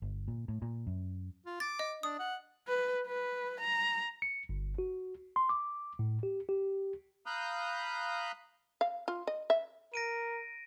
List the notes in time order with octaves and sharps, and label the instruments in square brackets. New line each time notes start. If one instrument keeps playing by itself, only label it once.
[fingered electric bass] G1
A#2
A2
A#2
F#2
[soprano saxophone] F4
[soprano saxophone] D6 [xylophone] A6
[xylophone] D#5
[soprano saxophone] D4 [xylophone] D#6
[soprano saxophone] F#5
[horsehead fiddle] B4
B4
A#5
[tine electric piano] C#7
G1
F#4
C6
D6
A2
G4
G4
[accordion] F5 A#5 B5 D#6 F#6 G6
[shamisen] F5
F4
D#5
E5
[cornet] A#4 [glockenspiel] A#6 D7 D#7